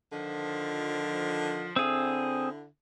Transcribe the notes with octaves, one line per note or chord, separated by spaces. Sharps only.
D3 D#3 F3
D3 C4 E4 G#4